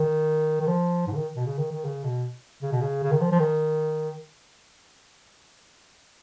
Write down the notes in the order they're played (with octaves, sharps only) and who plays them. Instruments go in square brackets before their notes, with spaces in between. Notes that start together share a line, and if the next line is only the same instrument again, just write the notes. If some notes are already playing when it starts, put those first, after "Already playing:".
Already playing: [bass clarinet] D#3
D#3
F3
G#2
C#3
D#3
B2
C#3
D#3
D#3
C#3
B2
C#3
B2
C#3
C#3
D#3
F3
F3
D#3